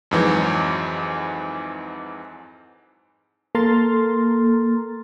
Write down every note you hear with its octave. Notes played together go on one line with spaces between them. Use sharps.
F2 G#2 E3 F#3
A#3 A4 A#5 C6 F6 A6